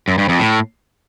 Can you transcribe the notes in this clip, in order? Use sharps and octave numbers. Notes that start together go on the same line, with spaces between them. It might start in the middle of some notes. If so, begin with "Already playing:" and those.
F#2
G2
F2
A2